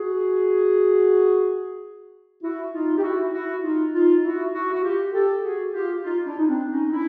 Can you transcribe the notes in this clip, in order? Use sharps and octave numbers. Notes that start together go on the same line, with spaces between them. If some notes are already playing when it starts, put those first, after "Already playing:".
Already playing: F#4 G#4
E4 F#4
D#4 F4
G4
E4 F#4
E4 F#4
D#4 F4
D#4 F4
E4 F#4
E4 F#4
F#4
F4 G4
G4 A4
F#4 G#4
F4 G4
D#4 F4
D4 E4
D#4
C4 D4
C#4 D#4
D#4
D4 E4